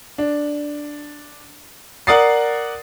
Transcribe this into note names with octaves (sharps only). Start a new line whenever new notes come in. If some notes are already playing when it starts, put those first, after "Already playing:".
D4
A#4 D5 F#5 D#6 A6 C7